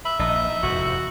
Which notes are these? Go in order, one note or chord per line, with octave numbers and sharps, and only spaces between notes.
E5 B5
A#1 D#4
F1 E2 G#2 F#4